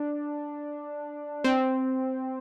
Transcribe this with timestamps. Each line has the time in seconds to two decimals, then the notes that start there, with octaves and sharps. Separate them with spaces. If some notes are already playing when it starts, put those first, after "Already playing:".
Already playing: D4
1.44 C4